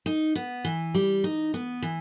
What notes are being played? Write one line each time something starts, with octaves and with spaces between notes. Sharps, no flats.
D#4
B3
E3
G3
D#4
B3
E3